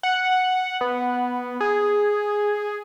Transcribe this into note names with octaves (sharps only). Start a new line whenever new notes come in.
F#5
B3
G#4